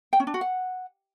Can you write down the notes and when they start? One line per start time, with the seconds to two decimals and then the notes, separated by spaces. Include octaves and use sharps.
0.13 G5
0.20 C#4
0.27 D4
0.34 F#4
0.41 F#5